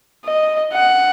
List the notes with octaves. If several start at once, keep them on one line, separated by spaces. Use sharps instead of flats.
D#5
F#5